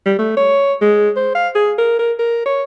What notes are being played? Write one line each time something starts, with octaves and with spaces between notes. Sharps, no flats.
G3
A3
C#5
G#3
C5
F5
G#4
A#4
A#4
A#4
C#5